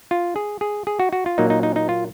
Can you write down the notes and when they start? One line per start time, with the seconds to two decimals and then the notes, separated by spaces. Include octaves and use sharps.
0.11 F4
0.36 G#4
0.61 G#4
0.87 G#4
1.00 F#4
1.13 F#4
1.26 F4
1.38 A#2 F#3 A#3 D#4
1.50 D#4
1.63 D#4
1.76 D#4
1.89 F4